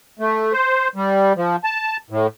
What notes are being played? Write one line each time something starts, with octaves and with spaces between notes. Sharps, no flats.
A3
C5
G3
F3
A5
A2